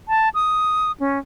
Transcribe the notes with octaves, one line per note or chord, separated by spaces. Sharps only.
A5
D#6
C#4